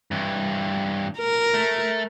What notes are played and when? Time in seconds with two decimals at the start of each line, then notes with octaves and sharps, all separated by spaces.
0.11 G2 E3
1.18 A#4
1.54 A3